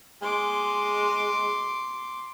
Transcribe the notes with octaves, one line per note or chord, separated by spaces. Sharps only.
G#3 C6 D6